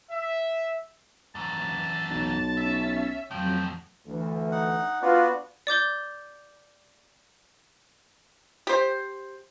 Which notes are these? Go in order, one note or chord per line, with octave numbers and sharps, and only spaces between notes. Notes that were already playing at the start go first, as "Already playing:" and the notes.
E5
F#2 E3 A5
B1
C#4 E5
F2 A2 F3 F#3 G5
D2 E3
D#4 F#5
B3 D4 F4 F#4 B4
D5 D6 G6 G7
G4 C5